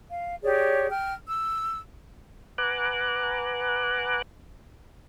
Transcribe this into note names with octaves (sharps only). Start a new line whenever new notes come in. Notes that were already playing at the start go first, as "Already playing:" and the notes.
F5
G4 G#4 C#5 D5
G5 F6
E6
B4 F#5 G#5 A#5 D6 F#6